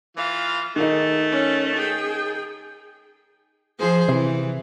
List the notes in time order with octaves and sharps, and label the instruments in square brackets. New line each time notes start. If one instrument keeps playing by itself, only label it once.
[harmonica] E3 F4 [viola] F5
[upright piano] D#3 D#4 [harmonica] A3 [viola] G#4
[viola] C#4
G#4 G5
[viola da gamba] F3 G#4 C5
[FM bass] C3 [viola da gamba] E3